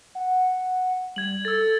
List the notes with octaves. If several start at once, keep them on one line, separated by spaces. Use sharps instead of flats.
F#5
G3 G#6 F#7
A4 E6 A6